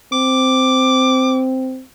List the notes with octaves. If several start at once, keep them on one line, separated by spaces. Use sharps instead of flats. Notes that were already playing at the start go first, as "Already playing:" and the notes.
C4 D6